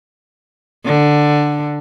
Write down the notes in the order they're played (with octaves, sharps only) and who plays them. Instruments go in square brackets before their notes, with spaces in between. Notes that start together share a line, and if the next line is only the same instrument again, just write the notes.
[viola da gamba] D3